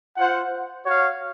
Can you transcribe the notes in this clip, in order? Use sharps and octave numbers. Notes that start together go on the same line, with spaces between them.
F4 C5 F#5
F#4 C#5 F5